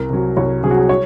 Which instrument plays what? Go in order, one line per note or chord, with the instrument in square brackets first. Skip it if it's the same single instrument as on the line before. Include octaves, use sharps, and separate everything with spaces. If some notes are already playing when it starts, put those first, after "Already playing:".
Already playing: [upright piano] C2 A#4
C3 F#3
C2 C#5
C3 F#3 G#4
F#4
G#4
C#5